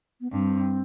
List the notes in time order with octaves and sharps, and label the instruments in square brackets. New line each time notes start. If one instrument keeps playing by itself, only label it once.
[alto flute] B3
[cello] G2 [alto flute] C4